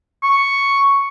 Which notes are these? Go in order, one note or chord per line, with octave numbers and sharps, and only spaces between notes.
C#6